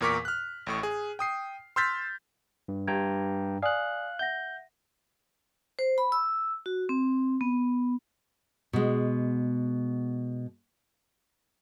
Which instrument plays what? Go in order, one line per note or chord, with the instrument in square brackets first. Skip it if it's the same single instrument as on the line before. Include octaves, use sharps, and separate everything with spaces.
[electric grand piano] E2 A#2 A#4 C#6 D6 B6
F6 F#6
A1 A2 C#6
G#4
G5 D#6 C7
C6 E6 F6 G6 A6 B6
[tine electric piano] G2
[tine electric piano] G2 G5 A#5 [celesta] G4 G#6
[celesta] D5 G#5 D#6 [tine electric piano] F5 F#6
[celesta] E5 F#5 A#6 [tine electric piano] G6
[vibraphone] C5
B5
E6
F#4
C4
B3
[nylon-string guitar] B2 G#3